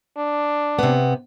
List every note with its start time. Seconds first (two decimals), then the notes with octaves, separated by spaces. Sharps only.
0.17 D4
0.79 C3 B3